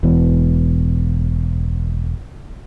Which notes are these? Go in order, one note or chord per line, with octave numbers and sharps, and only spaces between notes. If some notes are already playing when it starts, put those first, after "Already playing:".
E1 B2 E3